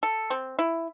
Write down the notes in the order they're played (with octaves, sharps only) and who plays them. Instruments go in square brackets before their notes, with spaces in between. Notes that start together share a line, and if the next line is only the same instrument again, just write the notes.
[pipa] A4
C4
E4